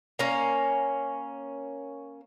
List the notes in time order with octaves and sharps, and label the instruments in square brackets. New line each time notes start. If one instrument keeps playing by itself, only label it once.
[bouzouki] A#3 C#4